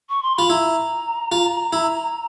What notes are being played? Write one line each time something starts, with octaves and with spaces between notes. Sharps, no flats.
C#6
C6
F4 B5
E4 A#5
F4
E4